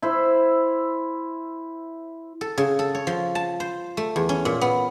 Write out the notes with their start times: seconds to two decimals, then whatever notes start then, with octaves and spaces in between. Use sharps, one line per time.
0.02 E4 C5
2.41 A4
2.58 C#3
2.79 A4
2.95 C#5
3.07 F3
3.35 A5
3.60 C5
3.97 A3
4.16 E2
4.29 C#4
4.45 A#2
4.61 B3